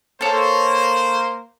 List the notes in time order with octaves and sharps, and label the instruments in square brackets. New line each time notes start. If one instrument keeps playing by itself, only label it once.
[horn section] A#3 C5 [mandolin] A4 C#5